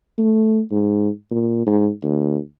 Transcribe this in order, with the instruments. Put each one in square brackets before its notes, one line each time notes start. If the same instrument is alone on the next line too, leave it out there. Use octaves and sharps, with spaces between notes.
[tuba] A3
G#2
A#2
G#2
D2